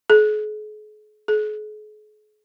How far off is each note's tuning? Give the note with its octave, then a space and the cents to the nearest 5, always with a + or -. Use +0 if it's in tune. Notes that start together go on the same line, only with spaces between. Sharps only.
G#4 +40
G#4 +40